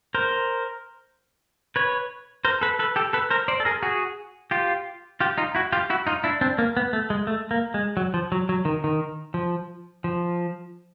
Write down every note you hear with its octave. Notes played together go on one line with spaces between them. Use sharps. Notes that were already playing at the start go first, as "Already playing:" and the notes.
A#4 C5
B4 C#5
A#4 C5
A4 B4
A4 B4
G4 A4
A4 B4
A#4 C5
C5 D5
A4
G#4 A#4
F#4 G#4
F4 G4
F4 G4
D#4 F4
E4 F#4
F4 G4
E4 F#4
D#4 F4
D4 E4
C4 D4
A#3
B3
A3
G#3
A3
A#3
G#3
F#3
F3
F#3
F#3
D#3
D#3
F3
F3